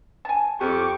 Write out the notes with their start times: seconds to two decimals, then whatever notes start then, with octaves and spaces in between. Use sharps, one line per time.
0.25 G#5 A5
0.60 F2 G4 C#6 D6